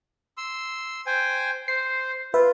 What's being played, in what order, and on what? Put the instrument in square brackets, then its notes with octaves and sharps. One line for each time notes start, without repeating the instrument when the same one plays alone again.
[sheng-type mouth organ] C6 E6
C5 G5 G#5
[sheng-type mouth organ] C5 [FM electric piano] C7
[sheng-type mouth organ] F4 [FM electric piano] B4 E5